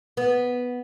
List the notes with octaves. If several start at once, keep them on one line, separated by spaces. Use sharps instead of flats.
B3